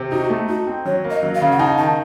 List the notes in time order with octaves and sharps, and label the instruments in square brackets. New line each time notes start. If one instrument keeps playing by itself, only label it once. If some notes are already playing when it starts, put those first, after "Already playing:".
Already playing: [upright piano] C3
[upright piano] D#4 [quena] F#4
[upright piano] A3
[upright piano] D#4 [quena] F#4
[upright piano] C4
[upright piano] F#3 [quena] C#5
[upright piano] A#3
[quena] D#5
[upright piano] F#3
[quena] F5
[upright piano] C#3
[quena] F#5
[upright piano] D#4 [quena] A5
[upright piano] D#3 [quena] A5